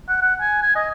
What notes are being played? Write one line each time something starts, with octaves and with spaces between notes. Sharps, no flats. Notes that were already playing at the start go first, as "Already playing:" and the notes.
F#5
F#5
G#5
G#5
D#5